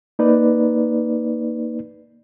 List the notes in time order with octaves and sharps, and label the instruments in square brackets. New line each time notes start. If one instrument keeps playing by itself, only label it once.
[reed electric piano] A#3 D#4 B4 D5